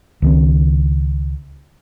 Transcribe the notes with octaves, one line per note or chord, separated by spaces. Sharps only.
C#2 D#3 C4